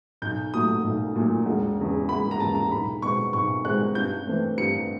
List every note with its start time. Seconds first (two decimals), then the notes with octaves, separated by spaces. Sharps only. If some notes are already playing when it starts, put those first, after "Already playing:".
0.22 B1 G6
0.53 A#2 F#3 A3 D#6
0.84 B1
1.15 A#2 F#3 A3
1.46 E1
1.78 E2 C#3
2.09 E1 B5
2.31 A#5
2.40 E2 C#3 A5
2.55 A#5
2.71 B1 B5
3.02 B2 G#3 C4 C#6
3.33 B1 C#6
3.64 B2 G#3 C4 F#6
3.95 G2 G6
4.27 E3 A3 C4
4.58 G2 C#7